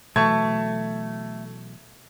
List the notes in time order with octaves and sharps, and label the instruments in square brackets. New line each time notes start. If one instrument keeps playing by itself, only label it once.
[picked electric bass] B2 E3 F#3 [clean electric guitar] A3 [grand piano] A5 C#6 G#6